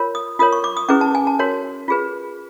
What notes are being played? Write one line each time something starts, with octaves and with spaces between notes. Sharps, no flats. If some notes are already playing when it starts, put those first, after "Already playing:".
Already playing: F4 A#4 C#5
D#6
F4 A#4 C#5 D#6
C#6
D6
D#6
C#4 E4 G#4 B4 D6
A5
G#5
A5
F#4 A#4 C#5
F4 G#4 B4